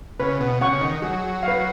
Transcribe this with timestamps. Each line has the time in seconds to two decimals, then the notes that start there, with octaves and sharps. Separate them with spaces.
0.20 C#3 B4
0.40 B2
0.61 C#3 F#5 C#6
0.73 C#3
0.81 D#3
1.02 F#3 G#4
1.43 F5
1.48 B4